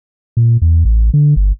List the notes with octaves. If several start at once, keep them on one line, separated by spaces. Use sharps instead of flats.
A#2
E2
A1
D3
G1